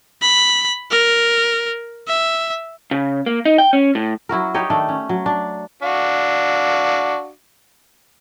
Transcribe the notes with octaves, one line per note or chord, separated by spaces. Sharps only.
B5
A#4
E5
C#3
A#3
D#4
G5
C#4
A2
F#3 E4 F#4 A#4
D#4 G4 C#5 D#5
D#3 A3 D4
C#4
F#3
D4
D4 F#4 F5